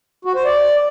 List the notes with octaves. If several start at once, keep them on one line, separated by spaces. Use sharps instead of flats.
F#4
C5
D5